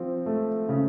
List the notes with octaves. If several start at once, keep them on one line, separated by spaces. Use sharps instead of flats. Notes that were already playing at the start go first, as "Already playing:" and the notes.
Already playing: F3 C4
A3
C#3